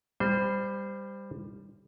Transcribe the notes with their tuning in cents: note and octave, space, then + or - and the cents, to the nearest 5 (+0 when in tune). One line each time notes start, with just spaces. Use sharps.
G3 +15 C5 -15